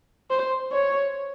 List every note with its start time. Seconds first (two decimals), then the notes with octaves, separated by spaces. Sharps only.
0.31 C5
0.72 C#5